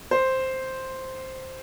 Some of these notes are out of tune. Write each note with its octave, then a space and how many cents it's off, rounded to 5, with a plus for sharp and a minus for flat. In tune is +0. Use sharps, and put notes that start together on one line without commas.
C5 +0